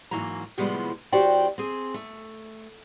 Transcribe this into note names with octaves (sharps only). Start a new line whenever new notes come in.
G#2 E3 F#3 A#3 A#5
A2 C3 F3 G3 G#3 B3
E2 F#4 G4 C5 D5 G5
C4 G#4
A3